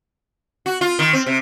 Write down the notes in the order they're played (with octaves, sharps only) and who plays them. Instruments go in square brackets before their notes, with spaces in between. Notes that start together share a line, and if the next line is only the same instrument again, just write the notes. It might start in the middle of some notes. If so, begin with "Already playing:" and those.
[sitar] F#4
F4
D#3
C4
C3